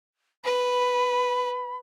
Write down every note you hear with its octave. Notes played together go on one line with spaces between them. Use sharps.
B4 B5